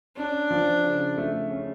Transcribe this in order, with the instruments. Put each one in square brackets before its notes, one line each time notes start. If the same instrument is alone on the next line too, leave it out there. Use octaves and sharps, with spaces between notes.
[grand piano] C#4 [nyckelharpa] D4
[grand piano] F3
C#3
A3
C#4